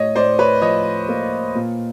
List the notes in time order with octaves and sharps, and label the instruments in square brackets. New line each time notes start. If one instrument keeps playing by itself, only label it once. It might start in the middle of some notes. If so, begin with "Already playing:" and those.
Already playing: [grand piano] A2 C#5 D#5
A2 C5 D5
B4 C#5
F3 C#5 D#5
A#3
A#2